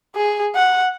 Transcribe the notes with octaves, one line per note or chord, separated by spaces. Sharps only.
G#4
F#5